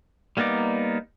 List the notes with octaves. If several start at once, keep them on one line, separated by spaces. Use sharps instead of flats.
G3 A#3 B3 D#4 D5